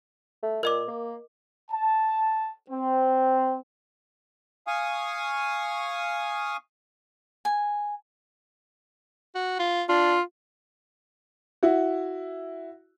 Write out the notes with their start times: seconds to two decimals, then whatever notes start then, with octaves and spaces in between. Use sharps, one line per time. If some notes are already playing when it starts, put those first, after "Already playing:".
0.43 A3
0.63 A#2 A#4 D#5 D6
0.88 A#3
1.71 A5
2.71 C4
4.67 F5 G#5 C#6 D#6
7.45 G#5
9.35 F#4
9.59 F4
9.89 D4 F4
11.63 E4 F#4